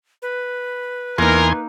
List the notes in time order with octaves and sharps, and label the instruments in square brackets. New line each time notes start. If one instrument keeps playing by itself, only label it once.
[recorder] B4
[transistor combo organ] E2 G#5 C6 [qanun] A#3 D#4 [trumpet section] A#4